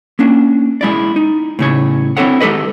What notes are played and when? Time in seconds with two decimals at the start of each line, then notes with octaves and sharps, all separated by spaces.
0.19 A#3 C#4 D4
0.81 G#3 E4 D5
1.16 D#4
1.59 A2 C#3 C#5
2.17 C4 D4 E4 A4 C#5 F#5
2.40 G#3 G4 A4 B4 D#5